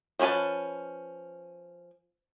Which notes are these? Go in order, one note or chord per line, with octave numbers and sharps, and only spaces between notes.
F3 C4 C#4 B4 A5